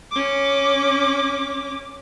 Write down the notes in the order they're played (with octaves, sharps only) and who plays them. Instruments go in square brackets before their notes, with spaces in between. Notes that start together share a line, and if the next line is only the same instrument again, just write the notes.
[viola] C#4 D6